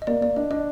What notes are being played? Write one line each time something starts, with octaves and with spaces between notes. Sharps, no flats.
D#5
A#3 D5
A#3 D5
D4 D#5
D4 D#5